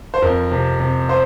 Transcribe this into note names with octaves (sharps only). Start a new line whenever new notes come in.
C5
F2 A#4
C3
C3
C5